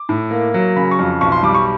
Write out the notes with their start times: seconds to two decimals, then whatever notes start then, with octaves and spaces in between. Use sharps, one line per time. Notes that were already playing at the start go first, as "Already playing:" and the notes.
Already playing: D6
0.09 A2
0.31 A#3
0.54 F#3
0.76 C#3 B5
0.91 C#6
0.99 F2
1.21 B1 C#6
1.32 C6
1.43 G3 D6
1.54 C#6